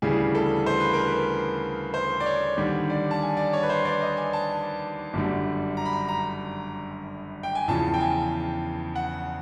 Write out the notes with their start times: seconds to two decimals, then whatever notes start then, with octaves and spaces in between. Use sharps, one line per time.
0.02 D2 C#3 E3 G3 G#4
0.35 A4
0.66 C5
0.80 B4
0.93 A#4
1.07 B4
1.94 C5
2.20 D5
2.26 C#5
2.57 D#2 D3 G3
2.90 D5
3.11 A5
3.22 G#5
3.37 D5
3.53 C#5
3.63 B4
3.69 C5
3.85 D5
4.02 D#5
4.17 G#5
4.33 A5
5.13 G1 F#2 D3 G3
5.77 A#5
5.85 B5
5.93 A#5
6.08 A#5
7.43 G5
7.55 G#5
7.68 E2 C#3 F3 A5
7.94 G5
8.00 G#5
8.96 F#5